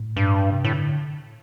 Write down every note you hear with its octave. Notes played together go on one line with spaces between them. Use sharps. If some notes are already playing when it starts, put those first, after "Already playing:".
Already playing: A2
G2
C3
A2 D3